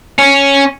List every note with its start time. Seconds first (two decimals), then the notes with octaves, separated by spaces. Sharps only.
0.19 C#4